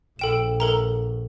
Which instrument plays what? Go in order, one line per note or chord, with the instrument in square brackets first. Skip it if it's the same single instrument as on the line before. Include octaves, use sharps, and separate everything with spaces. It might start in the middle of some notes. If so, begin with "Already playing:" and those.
[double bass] A#1 [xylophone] A4 G5 E7
[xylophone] A4 A#4 A#5